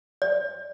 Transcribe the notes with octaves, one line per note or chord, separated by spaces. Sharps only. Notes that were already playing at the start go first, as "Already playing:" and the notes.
D5